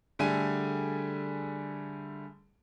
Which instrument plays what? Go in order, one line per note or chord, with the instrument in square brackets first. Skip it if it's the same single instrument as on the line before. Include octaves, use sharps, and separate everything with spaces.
[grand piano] D3 G3 A3 G#4 G#5 D#7